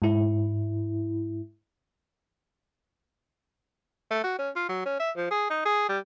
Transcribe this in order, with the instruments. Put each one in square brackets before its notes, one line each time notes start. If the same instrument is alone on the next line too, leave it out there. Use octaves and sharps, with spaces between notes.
[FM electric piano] G#2 E4
[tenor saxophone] A3
F#4
C#4
F4
F#3
C#4
E5
F3
G#4
D#4
G#4
G3